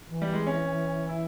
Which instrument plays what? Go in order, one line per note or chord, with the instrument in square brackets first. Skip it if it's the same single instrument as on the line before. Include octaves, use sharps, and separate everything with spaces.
[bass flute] E3
[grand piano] G3
G#3
C#4
E4